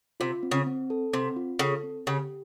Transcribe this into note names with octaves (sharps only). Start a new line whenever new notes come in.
C3 F4
C4
C#3
C4
A4
C3 C4
F4
C#3 A4
C4
C#3 G4